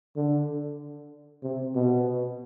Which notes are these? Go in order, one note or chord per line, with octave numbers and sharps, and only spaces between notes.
D3
C3
B2